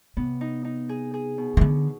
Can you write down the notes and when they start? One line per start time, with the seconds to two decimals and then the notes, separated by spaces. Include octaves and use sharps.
0.17 C3 B3
0.41 D#4
0.65 D#4
0.89 G#4
1.14 G#4
1.38 B2
1.57 D#3
1.61 D3 B3